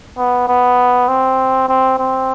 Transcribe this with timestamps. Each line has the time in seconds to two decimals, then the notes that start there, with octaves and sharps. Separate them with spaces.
0.18 B3
0.48 B3
1.08 C4
1.69 C4
1.99 C4